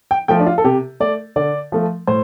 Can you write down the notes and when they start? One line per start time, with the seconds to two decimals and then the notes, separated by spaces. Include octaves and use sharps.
0.11 G5
0.28 F3 A3 G5
0.40 D4
0.46 F4
0.58 A4
0.64 C3 G4
1.00 A3 D5
1.36 D3 D5
1.72 F3 A3
2.07 A2 C5